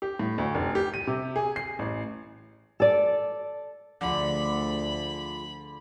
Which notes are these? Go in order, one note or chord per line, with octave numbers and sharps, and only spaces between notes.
G4
A2
D2
F1
G4
D#7
C3
G#4
C7
A1
A4 D5
D2 D3 F3 F4 G#4 B5